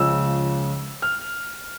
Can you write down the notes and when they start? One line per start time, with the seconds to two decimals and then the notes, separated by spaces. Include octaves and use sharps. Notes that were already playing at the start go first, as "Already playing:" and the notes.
Already playing: C#2 C#3 F3 E6
1.02 F6